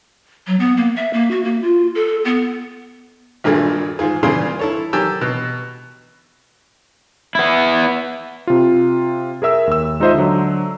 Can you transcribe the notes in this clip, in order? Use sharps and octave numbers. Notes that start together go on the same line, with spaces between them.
F#3
B3
A#3
E5
A#3
F#4
A#3
F4
A4
B3
G#1 G2 A#2 A3 G#4
G#2 F4 G#4
A#2 C#3 G3 F4 G#4 C6
E4 A4 C#5
D#3 F#3 G4 G#5 A5 E6
B2
B3 E4
C3 F4
G#4 A#4 E5 E6
D#2 E6
G#3 D#4 F4 C5 D#5 E5
D3 F#3